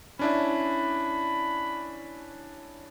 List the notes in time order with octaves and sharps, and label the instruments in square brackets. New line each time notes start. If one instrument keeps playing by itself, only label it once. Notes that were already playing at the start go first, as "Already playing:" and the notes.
[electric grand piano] C#4 D4 E4 [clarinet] B5